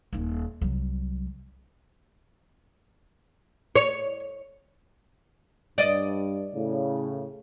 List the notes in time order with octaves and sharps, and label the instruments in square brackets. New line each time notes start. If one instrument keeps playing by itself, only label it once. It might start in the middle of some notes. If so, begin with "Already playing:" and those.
[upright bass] D#1 D#4
C2 F#3
[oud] C#5
[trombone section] G2 [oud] D5 D#5
[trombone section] A2 C#3